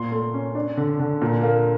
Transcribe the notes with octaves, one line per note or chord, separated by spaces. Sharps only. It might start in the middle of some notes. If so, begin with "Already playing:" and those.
Already playing: A#2 A#3 C6
A3
C#4
D4
D3
D3
A#2
A#3